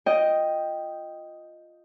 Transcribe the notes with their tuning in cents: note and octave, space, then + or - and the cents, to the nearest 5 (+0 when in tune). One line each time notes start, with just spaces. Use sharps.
F4 +0 D#5 +0 G5 +0